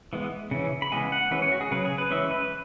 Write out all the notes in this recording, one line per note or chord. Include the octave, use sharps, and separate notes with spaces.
E3 G#3 B3
C#3 E3 C#4
B5
C#3 E3 G#3 B3 G#5
F#5
E3 G#3 C#4 B4
C#5
F#4
G#4
C#3 F#3 C#4 B4
G#4
B4
E3 G#3 C#4 E5
B4